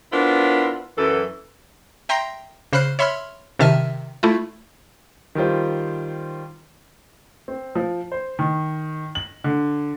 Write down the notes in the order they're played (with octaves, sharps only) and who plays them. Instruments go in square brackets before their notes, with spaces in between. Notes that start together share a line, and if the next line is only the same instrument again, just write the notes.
[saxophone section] B3 D4 E4 F4 A#4 C5
F#2 E3 A4
[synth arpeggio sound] E5 G5 A#5 C6 A#6 C7
C#3 C5 B5 F6 F#6 C7
C#5 E5 B5 C6 E6 F6
C3 D#3 E5 A5 F6 D#7
A3 E4 F4
[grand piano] D#3 G3 F4 C5
[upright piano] C4
F3
C5
D#3
F#7
D3